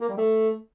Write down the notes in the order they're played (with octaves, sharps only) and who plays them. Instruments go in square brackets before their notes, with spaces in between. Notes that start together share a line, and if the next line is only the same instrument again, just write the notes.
[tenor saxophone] A#3
G3
A3